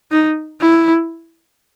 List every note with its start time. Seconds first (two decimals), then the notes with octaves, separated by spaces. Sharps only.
0.11 D#4
0.61 E4